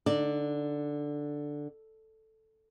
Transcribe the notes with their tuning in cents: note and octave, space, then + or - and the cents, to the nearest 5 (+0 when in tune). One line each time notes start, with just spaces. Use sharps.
D3 +0 D#4 -20 D5 +0